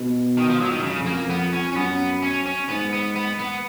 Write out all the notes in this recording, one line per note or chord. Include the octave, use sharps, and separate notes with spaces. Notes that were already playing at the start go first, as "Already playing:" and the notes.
Already playing: B2
D#3
F3
F#3
D#3
F#2 C#3
F2
A#3
F2
B3
C#4
C#4
F#2 B3
C#4
C#4
G#2 B3
B3
B3
B3